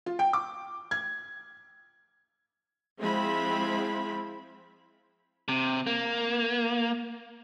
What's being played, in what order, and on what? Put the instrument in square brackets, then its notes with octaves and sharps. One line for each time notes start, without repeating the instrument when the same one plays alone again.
[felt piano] F4
G5
D6
G#6
[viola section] F3 G#3 C4 E4 B5
[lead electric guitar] C3
A#3